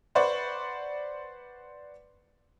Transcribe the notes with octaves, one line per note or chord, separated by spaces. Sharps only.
B4 C5 D5 F#5 B5 C#6